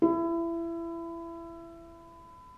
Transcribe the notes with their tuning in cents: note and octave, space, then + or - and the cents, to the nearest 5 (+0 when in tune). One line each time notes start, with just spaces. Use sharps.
E4 +25